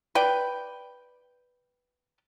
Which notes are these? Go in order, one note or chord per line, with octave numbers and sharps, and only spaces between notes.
B4 D5 G5